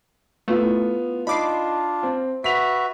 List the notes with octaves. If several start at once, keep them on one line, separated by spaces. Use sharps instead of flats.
A3 B3 E4 F4
D4 D#4 F4 B5 D6 C7
C4
F#4 B4 E5 B6 F7